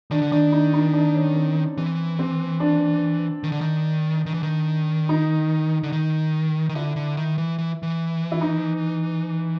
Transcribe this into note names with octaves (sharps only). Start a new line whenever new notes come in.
D#3 D4
D3
D#3 D4
D#4
D#4
D4
C#4
C4
E3 C4
C4
D4
D#3
D3
D#3
D#3
E3
D#3
D#4
D3
D#3
D#3
D3 E4
D3
D#3
E3
E3
E3
E4
D#4